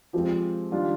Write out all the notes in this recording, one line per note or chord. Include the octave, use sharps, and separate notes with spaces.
F3 G#3 C4 G4
D#3 G3 D4 F4